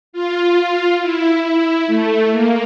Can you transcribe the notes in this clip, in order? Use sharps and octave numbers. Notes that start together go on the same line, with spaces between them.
F4
E4
E4
A3
A#3